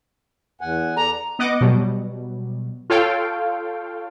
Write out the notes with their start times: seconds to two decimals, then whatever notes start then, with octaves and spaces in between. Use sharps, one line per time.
0.61 E2 F#5 G#5
0.97 A4 D5 A#5
1.39 B3 D#5 F#5 D6
1.61 B2 F#3 G3
2.90 F4 A4 C#5 F5 G5